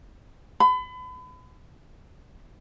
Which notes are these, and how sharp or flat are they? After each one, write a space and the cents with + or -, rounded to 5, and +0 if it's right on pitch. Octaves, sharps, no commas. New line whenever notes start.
B5 +35